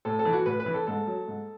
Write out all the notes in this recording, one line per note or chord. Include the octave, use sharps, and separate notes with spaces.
A2 A4
A4
E3
F#4
A2 B4
B4
E3
A4
G#2 A4
F#3
G#2